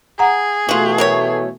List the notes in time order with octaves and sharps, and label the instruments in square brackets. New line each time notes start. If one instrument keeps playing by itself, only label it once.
[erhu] G#4 [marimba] F#5 A#5
[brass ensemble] B2 E3 A3 [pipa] F4 F#4
[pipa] F#3 A#4 C#5